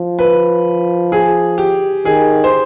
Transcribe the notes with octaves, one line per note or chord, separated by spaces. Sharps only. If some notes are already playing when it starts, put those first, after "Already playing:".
Already playing: F3
B4
G#4
G4
D#3 G#4
C5